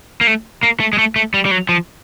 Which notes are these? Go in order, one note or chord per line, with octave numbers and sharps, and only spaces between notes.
A#3
A3
A#3
A3
G#3
A3
A3
G3
G3
F#3
F3